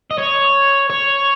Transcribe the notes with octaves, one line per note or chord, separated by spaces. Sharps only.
D#5
C#5
C#5